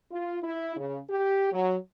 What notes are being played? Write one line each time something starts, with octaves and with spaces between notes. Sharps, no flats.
F4
E4
C#3
G4
F#3